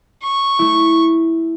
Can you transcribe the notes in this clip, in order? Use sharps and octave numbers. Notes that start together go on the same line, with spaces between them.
C#6
A3 E4